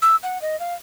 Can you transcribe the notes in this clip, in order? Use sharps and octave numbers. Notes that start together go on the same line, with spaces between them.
E6
F#5
D#5
F5